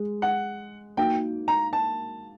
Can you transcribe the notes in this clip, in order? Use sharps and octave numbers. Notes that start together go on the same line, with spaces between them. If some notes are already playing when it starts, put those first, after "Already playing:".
Already playing: G#3
F#5
A#3 D#4 F#4 G5
A#5
A5